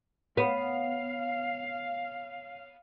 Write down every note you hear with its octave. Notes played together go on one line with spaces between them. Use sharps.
B3 C#5 F5